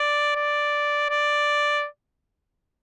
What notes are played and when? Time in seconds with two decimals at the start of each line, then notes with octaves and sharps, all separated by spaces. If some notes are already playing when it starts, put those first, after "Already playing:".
Already playing: D5
0.36 D5
1.10 D5